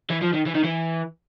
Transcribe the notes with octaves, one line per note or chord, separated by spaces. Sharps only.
E3
F3
D#3
E3
D#3
E3